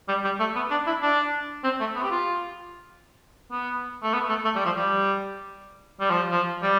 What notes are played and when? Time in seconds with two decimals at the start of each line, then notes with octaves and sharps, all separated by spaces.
0.08 G3
0.24 G3
0.39 A3
0.56 B3
0.71 D4
0.87 E4
1.02 D4
1.64 C4
1.80 A3
1.95 B3
2.03 G4
2.11 F4
3.51 B3
4.03 A3
4.13 B3
4.29 A3
4.45 A3
4.55 G3
4.65 F3
4.76 G3
6.00 G3
6.10 F3
6.31 F3
6.62 G3